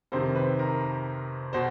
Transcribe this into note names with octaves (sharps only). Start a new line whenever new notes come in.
F2 C3 D#3 C5
B4
A#4
B2 C5